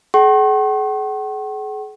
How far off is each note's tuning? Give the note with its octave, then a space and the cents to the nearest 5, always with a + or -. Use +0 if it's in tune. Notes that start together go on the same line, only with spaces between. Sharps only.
G#4 +40 F#5 +45 C#6 -45